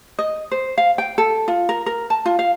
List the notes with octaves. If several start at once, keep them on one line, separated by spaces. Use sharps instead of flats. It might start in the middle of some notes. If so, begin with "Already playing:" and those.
D#5
C5
F5
G5
A4
F4
A#4
A#4
A5
F4
F5